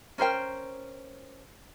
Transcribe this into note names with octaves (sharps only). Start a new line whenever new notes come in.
C#4 A#4 C5 G5